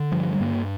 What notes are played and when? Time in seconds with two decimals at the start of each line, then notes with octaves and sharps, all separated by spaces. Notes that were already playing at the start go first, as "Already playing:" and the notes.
Already playing: D3
0.12 G2 F3
0.34 G3
0.40 G2 A#3